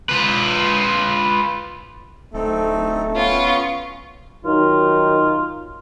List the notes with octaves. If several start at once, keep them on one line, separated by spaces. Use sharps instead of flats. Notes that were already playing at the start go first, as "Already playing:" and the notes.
F4 B4
D1 A3 C4 D#4 A4
B3 C#4 F4 C#6
D#3 F#3 D#4 F4